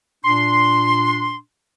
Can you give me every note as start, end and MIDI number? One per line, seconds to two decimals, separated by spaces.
0.25 1.37 46
0.25 1.37 62
0.25 1.37 84